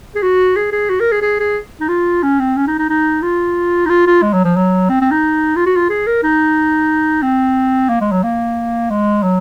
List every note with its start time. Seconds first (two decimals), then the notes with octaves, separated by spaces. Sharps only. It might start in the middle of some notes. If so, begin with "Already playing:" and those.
0.15 G#4
0.23 F#4
0.57 G#4
0.73 G#4
0.90 F#4
1.00 A#4
1.12 G#4
1.22 G#4
1.40 G#4
1.80 D#4
1.89 F4
2.23 C#4
2.39 C4
2.56 C#4
2.67 D#4
2.79 D#4
2.90 D#4
3.22 F4
3.86 D#4
3.89 F4
4.07 F4
4.22 G#3
4.33 F#3
4.45 F3
4.56 F#3
4.90 C4
5.01 C4
5.11 D#4
5.56 F4
5.66 F#4
5.76 F4
5.89 G#4
6.07 A#4
6.23 D#4
7.22 C4
7.89 A#3
8.01 G#3
8.12 F#3
8.24 A#3
8.90 G#3
9.23 F#3